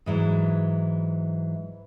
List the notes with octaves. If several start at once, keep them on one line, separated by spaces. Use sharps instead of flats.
G#2 E3 F#3